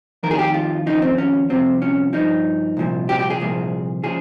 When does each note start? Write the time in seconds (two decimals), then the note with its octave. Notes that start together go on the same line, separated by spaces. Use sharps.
0.23 F2 D#3 A#4
0.31 G#4
0.39 G4
0.54 F4
0.87 D#2 C#3 F3 D#4
1.02 C4
1.18 C#4
1.50 C2 C3 F3 C4
1.82 C#4
2.13 G2 F3 D#4
2.77 C2 A#2 F3
3.09 G4
3.19 G4
3.30 G#4
3.40 C2 A#2 F3
4.03 C#3 F3 G#4